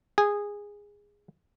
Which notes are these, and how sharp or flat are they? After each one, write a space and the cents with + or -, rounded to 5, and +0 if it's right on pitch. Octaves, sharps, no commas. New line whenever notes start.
G#4 -15